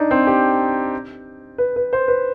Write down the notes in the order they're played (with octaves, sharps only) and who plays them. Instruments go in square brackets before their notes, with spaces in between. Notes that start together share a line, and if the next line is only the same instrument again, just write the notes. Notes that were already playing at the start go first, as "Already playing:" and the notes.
Already playing: [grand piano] D4 D#4
C4
G4
B4
B4
C5
B4